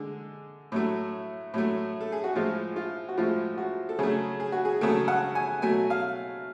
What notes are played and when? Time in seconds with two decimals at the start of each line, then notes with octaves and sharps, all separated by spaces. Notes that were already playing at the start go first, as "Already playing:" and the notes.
Already playing: D3 G#3
0.72 A2 F#3 A3
1.54 A2 F#3 A3
2.01 A4
2.12 G#4
2.24 F#4
2.35 A2 F3 G#3 F4
2.76 F4
3.09 F#4
3.17 A2 F3 G#3 F4
3.58 F#4
3.89 A4
3.99 C#3 F#3 A3 G#4
4.40 G#4
4.52 F#4
4.65 G#4
4.81 C#3 F#3 A3 A4
5.08 F#5
5.35 G#5
5.62 B2 F#3 A3 G#5
5.90 F5